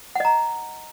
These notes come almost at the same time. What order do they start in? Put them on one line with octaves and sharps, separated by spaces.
F#5 D#5 A#5